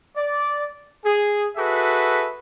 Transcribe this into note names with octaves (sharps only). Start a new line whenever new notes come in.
D5
G#4
F#4 G#4 A4 B4 E5